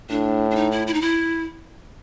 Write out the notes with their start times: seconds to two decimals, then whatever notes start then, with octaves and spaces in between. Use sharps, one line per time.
0.09 A2 D4
0.51 D4
0.56 D#4
0.71 E4
0.87 E4
0.94 D#4
1.01 E4